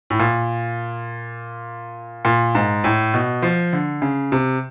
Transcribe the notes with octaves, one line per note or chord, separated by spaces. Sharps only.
A2
A#2
A#2
G#2
A2
B2
F3
D3
C#3
C3